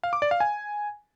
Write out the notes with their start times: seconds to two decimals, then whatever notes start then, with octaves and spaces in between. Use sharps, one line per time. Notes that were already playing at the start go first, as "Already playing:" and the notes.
0.03 F5
0.13 D6
0.22 D5
0.31 F5
0.40 G#5